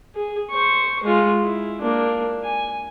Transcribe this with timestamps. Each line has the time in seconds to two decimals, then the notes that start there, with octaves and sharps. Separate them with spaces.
0.15 G#4
0.50 C5 C#6
1.03 G#3 F4
1.43 E4
1.81 A#3 D4
2.44 G#5